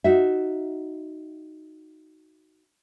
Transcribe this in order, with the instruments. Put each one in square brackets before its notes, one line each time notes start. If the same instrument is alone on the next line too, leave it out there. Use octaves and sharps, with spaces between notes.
[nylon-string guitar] D#4 F#4 E5